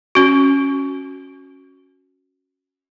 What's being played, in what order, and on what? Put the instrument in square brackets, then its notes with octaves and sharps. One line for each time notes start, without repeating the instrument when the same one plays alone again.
[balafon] C#4 F#4